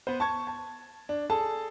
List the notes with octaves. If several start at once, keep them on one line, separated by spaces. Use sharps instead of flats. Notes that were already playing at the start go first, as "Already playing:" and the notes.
B3 B4 C5
A5 C#6 G#6
A5
D4
G#4 A4 A5